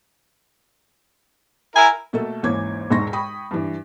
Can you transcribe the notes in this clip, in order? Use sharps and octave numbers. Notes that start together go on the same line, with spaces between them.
E4 A#4 G#5
B2 A3 A#3 A4
G#1 D#2 E3 C#4 D6 G#6
E1 B1 G#2 C6 C#6 A#6
G5 B5 C#6 D#6
G2 E3